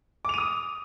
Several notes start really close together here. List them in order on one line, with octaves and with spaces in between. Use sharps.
D6 F7 D#7 D#6